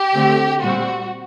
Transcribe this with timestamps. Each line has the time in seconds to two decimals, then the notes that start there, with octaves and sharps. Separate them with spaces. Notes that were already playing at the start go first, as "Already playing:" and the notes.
Already playing: G4
0.14 D3 A3 C4
0.63 A#2 G3 C4 F#4